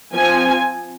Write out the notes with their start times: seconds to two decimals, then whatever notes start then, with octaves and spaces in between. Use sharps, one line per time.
0.14 F3 C4 G#5